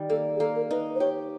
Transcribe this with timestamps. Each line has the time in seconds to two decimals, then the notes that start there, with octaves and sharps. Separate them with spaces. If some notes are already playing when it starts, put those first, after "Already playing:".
Already playing: D#3 G3
0.09 A#3 A4
0.36 G#4
0.40 A#3 A4
0.56 A#4
0.71 D#4 B4
0.96 C5
1.00 G4 C#5